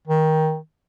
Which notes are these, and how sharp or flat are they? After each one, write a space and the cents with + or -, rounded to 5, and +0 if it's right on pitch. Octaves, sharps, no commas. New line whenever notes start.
D#3 +15